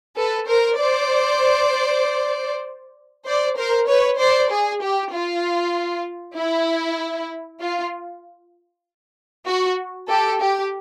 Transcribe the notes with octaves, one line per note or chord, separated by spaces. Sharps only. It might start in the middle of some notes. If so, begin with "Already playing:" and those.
A4 B4
A#4 C5
C5 D5
C5 D5
A#4 C5
B4 C#5
C5 D5
G#4
G4
F4
E4
F4
F#4
G4 A4
G4